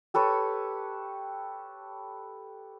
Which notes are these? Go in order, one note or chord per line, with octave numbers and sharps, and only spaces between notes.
G4 A4 B4 C#5